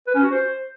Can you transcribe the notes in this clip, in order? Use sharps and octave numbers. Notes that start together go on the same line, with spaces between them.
B4
C#4
F#4
C5